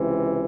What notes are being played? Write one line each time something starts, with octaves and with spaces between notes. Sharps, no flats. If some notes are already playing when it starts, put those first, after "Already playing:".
Already playing: C#2 C3 E3